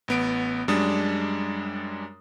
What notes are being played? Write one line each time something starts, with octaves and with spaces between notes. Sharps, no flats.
A1 B3 D7
F#2 G3 G#3 D4 D#6